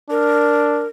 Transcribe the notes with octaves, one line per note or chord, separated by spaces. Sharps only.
D4 A#4